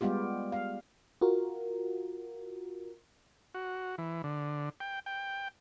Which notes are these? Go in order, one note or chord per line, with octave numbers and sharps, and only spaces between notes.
G3 G#3 B3 F4 G4
F5
F4 F#4 A#4
F#4
E3
D3
G5
G5